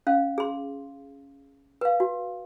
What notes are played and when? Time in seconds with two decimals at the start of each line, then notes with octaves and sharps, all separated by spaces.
0.07 C#4 F5
0.38 G#4 C6
1.81 B4 F5
2.00 F#4